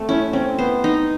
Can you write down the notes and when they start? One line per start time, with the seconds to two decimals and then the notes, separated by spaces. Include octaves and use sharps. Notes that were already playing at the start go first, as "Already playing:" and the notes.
Already playing: A3 C4
0.09 C#4 E4
0.33 C4 C#4
0.58 B3 C5
0.84 D#4